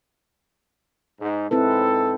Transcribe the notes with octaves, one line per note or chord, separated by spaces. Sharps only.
G#2
G#2 C4 E4 A4 B4